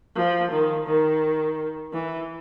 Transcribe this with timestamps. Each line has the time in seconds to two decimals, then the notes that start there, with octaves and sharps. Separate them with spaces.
0.16 F3
0.51 D#3
0.87 D#3
1.93 E3